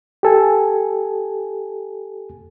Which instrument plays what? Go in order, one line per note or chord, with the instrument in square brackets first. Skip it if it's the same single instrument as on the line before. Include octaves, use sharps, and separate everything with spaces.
[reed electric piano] G4 A4 G#5